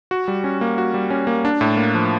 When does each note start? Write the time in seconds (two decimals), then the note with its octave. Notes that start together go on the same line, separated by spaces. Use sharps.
0.11 F#4
0.28 G3
0.44 C#4
0.61 A#3
0.78 F#4
0.94 G3
1.10 C#4
1.27 A#3
1.45 D4
1.61 A2
1.77 A#3
1.95 F3